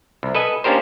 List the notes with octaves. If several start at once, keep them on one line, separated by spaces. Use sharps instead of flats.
C2
A4 B4 D#5 G#5
A#3 C#4 D4 G4 A#4 C5